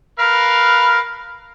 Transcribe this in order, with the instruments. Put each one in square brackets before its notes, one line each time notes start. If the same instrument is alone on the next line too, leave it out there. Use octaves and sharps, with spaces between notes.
[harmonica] A#4 B4 F5